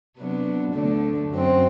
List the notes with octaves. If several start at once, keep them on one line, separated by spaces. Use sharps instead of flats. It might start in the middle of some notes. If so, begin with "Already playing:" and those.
C3 F#3 B3 D4
D2 D3 A3 D4
F#2 F#3 C4